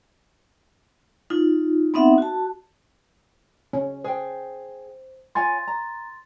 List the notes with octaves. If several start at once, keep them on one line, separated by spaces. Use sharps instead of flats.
D#4 F4
B3 C4 D#4 E5 F#5
F#4 A5
C#4
G#4 C5 G5
F4 C#5 G#5 C6 A6
A#5